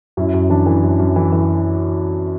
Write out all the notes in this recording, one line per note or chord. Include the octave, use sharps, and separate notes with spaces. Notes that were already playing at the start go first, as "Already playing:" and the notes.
F#2 E4
F#2
E3 D4
E3
F#2
F#2
E3
E3